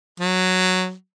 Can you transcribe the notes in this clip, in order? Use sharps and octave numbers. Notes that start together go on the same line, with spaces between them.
F#3